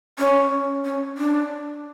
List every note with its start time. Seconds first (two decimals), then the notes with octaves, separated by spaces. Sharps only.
0.18 C#4
0.85 C#4
1.17 D4